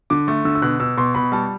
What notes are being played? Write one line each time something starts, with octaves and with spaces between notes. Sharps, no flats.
D3 D6
A3
D3 E6
E6
B2 F#6
B2 E6
B2 C6
B2 B5
G3 A5